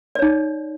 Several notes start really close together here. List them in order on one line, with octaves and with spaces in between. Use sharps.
D5 C#5 D#4